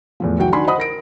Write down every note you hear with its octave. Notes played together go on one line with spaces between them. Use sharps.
E2 A2 F3
B1 E3 F#4 G5
D#3 D4 F#4 G#5 B5 C6
C5 D#5 F#5 B5 D#6
A#4 A#6 D7